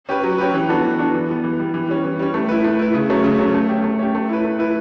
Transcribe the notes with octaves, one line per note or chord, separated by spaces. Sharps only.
C#4 G4 B4
F#3
C#4 G4 B4
E3
B3 D4 F#4 A4
E3
B3 D4 F#4 A4
E3
G3 B3
E3
G3 B3
E3
G3 C#4
E3
G3 C#4
A3
E4 B4
A3
E4 B4
C#3
F#3 A3 C#4
C#3
F#3 A3 C#4
A3
C#4 G4
A3
C#4 G4
A3
E4 B4
A3
E4 B4